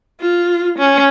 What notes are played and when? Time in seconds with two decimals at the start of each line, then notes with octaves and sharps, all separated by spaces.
0.21 F4
0.79 C#4